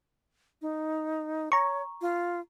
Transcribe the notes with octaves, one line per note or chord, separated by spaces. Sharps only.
D#4
C#5 A#5 C#6
F4